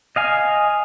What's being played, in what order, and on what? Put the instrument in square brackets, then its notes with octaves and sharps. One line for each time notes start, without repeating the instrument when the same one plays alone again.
[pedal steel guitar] D#5 F5 G#5